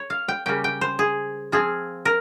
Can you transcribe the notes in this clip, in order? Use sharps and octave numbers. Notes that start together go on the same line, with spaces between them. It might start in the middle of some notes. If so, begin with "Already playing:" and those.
Already playing: C#5
F5
G5
C#3 G3 A#3 C#4 G5
G5
C5
G#4
F3 C4 F4 G#4
A#4